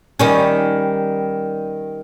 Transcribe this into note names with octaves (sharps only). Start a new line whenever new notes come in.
D#3 G3 C#4